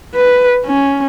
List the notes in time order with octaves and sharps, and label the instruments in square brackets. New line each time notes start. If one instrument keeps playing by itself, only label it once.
[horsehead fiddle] B4
C#4